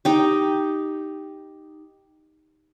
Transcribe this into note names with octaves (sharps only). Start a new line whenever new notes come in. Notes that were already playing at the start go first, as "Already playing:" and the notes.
D#4 G4